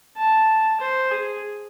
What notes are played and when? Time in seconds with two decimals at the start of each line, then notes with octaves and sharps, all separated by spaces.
0.17 A5
0.80 C5
1.11 G#4